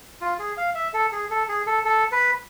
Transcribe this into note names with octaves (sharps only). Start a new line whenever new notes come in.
F4
G#4
F5
E5
A4
G#4
A4
G#4
A4
A4
B4